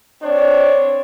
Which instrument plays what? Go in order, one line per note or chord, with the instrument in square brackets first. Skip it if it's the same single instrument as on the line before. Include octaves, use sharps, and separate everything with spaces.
[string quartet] C4 C#5 [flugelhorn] D4